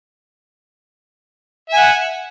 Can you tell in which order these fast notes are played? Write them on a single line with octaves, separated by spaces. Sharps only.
E5 G#5 F#5